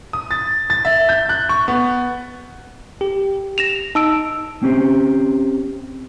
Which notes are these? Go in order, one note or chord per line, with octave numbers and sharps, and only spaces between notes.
D#6
A6
A6
E5
G6
F#6
C#6
B3
G4
A#6 E7 F7
D#4 A5 E6 D7
C4 C#4 G4 C5